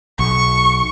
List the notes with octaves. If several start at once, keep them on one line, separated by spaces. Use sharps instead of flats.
B1 C#6